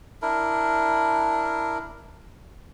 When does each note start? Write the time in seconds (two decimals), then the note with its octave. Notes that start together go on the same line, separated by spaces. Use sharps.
0.22 D4 E4 A#4